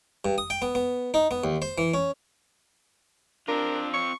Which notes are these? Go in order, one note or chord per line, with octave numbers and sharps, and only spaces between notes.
G2
D#6
G5
B3
B3
D#4
B3
D#2
C5
E3
C#4
C4 D4 F4 A#4
C#6